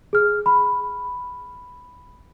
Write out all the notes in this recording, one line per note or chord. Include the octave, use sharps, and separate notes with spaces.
G#4 F6
B5